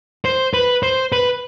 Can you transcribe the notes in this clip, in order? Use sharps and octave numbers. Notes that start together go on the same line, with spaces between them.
C5
B4
C5
B4